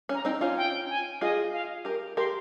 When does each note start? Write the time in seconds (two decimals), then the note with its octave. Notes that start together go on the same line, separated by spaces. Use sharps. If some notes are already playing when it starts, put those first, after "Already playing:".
0.09 C#4
0.15 A#5
0.25 C4 D#4
0.41 C#4 F4
0.57 G5
0.90 G#5
1.21 F4 G#4 D#5
1.53 F5
1.85 G4 A#4
2.17 G4 A#4 C6